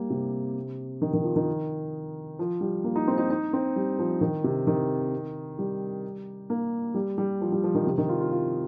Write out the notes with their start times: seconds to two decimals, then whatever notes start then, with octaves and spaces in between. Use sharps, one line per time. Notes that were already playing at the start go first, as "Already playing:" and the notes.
Already playing: G3 A#3
0.10 C3
1.02 D#3
1.13 D#3
1.24 F3
1.36 D#3
2.39 F3
2.61 G3
2.84 A#3
2.96 D#4
3.08 C4
3.18 D#4
3.30 D#4
3.53 C4
3.76 G3
3.99 F3
4.21 D#3
4.44 C3
4.67 D#3
5.59 G3
6.50 A#3
6.94 G3
7.18 G3
7.41 F3
7.52 G3
7.64 F3
7.75 D#3
7.87 C3
7.98 D#3
8.09 F4
8.20 F4
8.32 F4